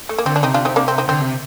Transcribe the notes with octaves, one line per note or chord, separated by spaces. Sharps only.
A3
A#3
D3 C4
D4
C3 C4 D#4
D4 F4
C4 D#4
A#3 D4
C4
C4 D#4
D3 C4
C3